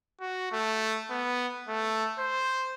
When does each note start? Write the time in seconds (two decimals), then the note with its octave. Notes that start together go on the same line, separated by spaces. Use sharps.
0.21 F#4
0.52 A3
1.10 B3
1.68 A3
2.19 C5